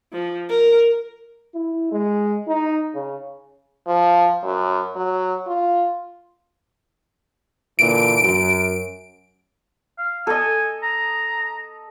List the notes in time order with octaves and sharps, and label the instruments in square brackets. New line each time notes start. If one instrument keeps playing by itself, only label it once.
[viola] F3
A#4
[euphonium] E4
G#3
D#4
C#3
[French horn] F3
F#2
F#3
F4
[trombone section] A#2 D3 E3 [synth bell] D7
[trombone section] F#2
[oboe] F5
[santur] A4 D#5 [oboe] G#5
[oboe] A#5